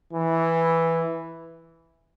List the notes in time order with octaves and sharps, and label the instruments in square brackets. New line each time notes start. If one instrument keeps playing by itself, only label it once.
[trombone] E3